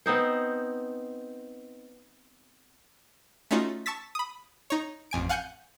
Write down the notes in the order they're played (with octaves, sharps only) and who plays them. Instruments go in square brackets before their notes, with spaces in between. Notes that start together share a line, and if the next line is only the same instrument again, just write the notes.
[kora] B3 C4 D#4 C5
[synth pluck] A3 C#4 D#4 F4 F#4
A5 C#6 E6 A6 B6
B5 D#6
D#4 C#5
A1 F2 G#5 D7
F5 F#5 G#5 F#6 G6 C#7